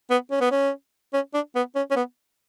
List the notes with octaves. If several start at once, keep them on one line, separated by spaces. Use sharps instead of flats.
B3
C#4
B3
C#4
C#4
D4
B3
C#4
C#4
B3